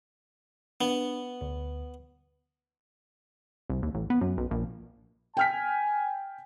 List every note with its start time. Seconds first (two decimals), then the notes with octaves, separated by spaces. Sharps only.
0.81 B3 D4
1.41 D2
3.70 C2
3.83 D#2
3.94 A1
4.10 B3
4.21 F#2
4.37 B1
4.51 A#1
5.37 G5 G#5 F6 B6